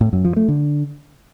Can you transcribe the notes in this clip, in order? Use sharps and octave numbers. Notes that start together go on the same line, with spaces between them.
A2
F#2
F3
A3
D3